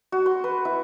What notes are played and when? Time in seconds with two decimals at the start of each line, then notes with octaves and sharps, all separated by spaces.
0.12 F#4
0.26 C6
0.44 B4
0.65 E4